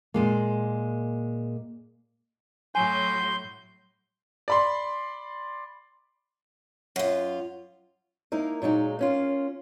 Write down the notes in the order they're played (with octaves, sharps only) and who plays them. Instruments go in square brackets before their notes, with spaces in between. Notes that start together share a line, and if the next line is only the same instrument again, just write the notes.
[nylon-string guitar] A#2 G#3 A#3
[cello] A2 F#3 [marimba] G#5 [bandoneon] C6 G6
[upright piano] D5 B5 C6
[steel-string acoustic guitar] F#2 F4
A#3 D#4 E4 A#4
A#2 F#3 G#3 D#4
A#3 C#4 F4